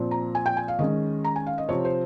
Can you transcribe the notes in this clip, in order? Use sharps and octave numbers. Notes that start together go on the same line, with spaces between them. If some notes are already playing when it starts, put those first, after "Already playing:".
Already playing: A#2 F3 C4
A#5
G#5
G5
G#5
F5
D#3 G#3 C#4 D#5
A#5
G#5
F5
D#5
C3 F3 C4 C#5
C5